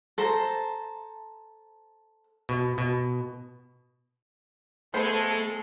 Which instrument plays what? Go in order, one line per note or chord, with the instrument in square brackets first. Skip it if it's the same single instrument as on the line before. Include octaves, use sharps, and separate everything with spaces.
[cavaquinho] A4 C5 A5 A#5
[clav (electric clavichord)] B2
B2
[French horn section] G#3 [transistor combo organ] A3 [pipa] B3 C5 [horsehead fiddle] A4